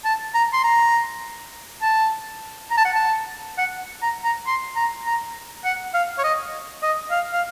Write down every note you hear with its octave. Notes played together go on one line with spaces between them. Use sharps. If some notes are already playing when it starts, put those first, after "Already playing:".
A5
A#5
C6
A#5
A5
A#5
A5
F#5
A5
F#5
A#5
A#5
C6
A#5
A#5
F#5
F5
C#5
D#5
D#5
F5
F5